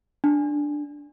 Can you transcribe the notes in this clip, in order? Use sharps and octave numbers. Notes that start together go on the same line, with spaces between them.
D4